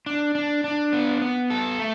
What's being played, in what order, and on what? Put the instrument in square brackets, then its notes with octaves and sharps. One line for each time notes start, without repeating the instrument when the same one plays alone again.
[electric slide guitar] D4
D4
D4
B3
B3
A4
A3